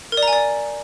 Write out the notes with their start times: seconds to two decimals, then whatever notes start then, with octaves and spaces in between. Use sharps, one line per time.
0.12 A#4
0.17 D5
0.23 A#5
0.28 G#5
0.33 D5